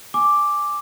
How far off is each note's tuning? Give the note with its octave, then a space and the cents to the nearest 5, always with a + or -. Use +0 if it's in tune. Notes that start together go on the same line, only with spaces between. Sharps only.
G#5 +0 D6 +0